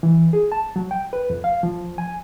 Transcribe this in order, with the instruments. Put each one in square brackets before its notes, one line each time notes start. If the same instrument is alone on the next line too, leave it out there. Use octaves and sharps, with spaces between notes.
[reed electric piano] E3
G#4
A5
F#3
G5
B4
F2
F5
F3
G#5